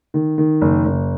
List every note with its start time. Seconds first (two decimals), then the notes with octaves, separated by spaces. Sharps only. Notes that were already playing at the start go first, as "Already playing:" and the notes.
0.14 D#3
0.38 D#3
0.61 F#1
0.85 F#1